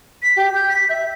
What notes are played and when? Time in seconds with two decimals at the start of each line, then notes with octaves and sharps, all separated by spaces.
0.22 B6
0.36 G4
0.54 G6
0.69 B6
0.89 E5